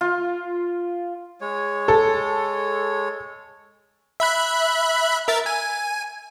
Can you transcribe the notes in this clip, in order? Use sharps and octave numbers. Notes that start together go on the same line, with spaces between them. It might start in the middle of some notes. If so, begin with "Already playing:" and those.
F4
G#3 C#5
A4
E5 B5 F#6
A#4 E5 A6
G#5